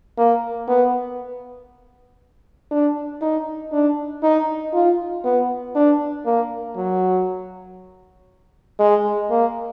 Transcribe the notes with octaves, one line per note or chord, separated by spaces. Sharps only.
A#3
B3
D4
D#4
D4
D#4
F4
B3
D4
A#3
F#3
G#3
A#3